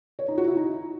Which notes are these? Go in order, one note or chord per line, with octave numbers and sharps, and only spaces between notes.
C#5
D#4
F#4
E4
D#4